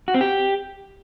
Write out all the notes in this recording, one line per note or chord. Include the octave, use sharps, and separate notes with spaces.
F#4
C4
G4